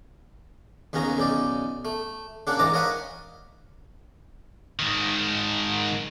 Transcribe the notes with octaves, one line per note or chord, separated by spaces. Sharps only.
D#2 C#3 B3 C#4 A#5
B1 C#3 D#4 D5
A3
C#3 A#3 D4 F#5
G#2 E3 D5 A#5 D6
A#4 C#5 D#5 F5 F#5 B5
G#2 D#3